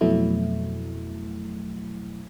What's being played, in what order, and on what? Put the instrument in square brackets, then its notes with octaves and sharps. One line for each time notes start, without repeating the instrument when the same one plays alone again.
[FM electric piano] F2 B2 F#3 A3 E4